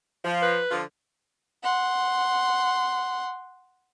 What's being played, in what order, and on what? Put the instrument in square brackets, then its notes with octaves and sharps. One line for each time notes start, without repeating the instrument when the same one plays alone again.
[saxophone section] F3
[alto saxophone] B4
[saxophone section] D3 F3 F4
[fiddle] F#5 C6